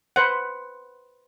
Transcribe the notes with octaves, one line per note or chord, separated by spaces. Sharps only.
B4 C5 F#5